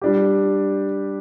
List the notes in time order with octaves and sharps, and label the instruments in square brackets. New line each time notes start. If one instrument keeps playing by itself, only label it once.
[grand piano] G3 D4 G4